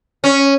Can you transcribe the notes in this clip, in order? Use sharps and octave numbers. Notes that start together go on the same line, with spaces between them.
C#4